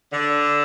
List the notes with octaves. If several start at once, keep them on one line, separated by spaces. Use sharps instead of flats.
D3